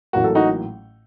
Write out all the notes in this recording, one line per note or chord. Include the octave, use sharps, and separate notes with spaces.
A1 A2 F#3 A#3 F#4
A4
D#4 F#4